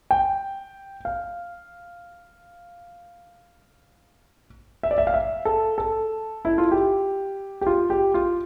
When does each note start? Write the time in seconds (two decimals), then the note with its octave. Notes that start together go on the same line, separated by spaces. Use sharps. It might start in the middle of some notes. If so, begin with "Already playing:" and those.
0.11 G5
1.05 F5
4.83 E5
4.91 D5
4.98 E5
5.07 F5
5.14 E5
5.45 A4
5.78 A4
6.45 E4
6.58 F4
6.72 G4
7.61 G4
7.66 F4
7.90 G4
8.14 F4